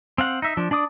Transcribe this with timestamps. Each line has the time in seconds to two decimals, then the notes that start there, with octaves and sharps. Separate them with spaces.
0.18 C4 F5 F#5
0.42 D#4 E5
0.57 F3 D4
0.71 D4 D5 D6 D#6